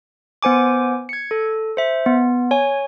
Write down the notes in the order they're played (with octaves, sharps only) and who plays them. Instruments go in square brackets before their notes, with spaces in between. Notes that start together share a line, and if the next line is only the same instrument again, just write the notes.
[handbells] B3 C5 G#5 D6
G#6 C#7
A4
C5 E5
B3
C#5 G#5